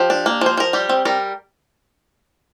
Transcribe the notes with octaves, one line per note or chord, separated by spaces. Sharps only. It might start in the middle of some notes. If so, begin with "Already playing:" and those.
Already playing: F3 G4
D4
A#3
F3 C5
F3 A#4
G3 G4
C4
G3 A#4